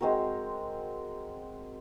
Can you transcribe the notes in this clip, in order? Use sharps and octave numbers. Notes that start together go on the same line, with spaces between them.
G#3 C4 F#4 A#4